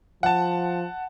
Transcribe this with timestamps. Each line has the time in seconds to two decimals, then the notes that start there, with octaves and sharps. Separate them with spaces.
0.23 F3 F#5 A5